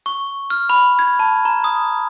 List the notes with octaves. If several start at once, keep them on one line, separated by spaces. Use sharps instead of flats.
C#6
F6
B5
G#6
A5
A#5
D#6